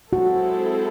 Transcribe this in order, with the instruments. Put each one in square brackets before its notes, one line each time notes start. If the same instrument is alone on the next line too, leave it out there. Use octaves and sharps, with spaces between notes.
[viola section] G#3 C4 E4 A4 [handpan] F#4